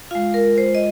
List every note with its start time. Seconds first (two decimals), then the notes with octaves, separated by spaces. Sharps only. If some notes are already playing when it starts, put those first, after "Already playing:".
0.11 G#3 F4 F5
0.34 A#4
0.58 C5
0.75 D#5